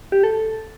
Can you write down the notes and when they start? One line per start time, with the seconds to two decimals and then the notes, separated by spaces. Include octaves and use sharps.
0.12 G4
0.23 A4